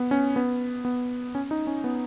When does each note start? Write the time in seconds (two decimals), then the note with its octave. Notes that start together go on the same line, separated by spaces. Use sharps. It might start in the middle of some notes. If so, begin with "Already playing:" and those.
Already playing: B3
0.11 C#4
0.36 B3
0.85 B3
1.35 C#4
1.51 D#4
1.67 C#4
1.84 B3